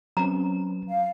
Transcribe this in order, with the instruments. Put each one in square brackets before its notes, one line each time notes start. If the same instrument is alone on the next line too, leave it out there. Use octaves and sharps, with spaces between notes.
[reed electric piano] F#3 [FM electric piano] C4 C#4 B4 [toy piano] A#5
[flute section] F5